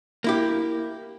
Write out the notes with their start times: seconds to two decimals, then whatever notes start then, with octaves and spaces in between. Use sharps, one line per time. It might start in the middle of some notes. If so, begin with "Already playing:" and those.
0.24 A#3 E4 G4